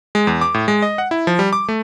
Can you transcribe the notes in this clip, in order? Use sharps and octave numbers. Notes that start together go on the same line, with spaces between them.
G#3
E2
D6
A2
G#3
D#5
F#5
E4
F3
G3
D6
A3